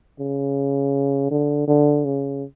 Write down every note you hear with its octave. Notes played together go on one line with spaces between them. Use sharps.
C#3
D3
D3
C#3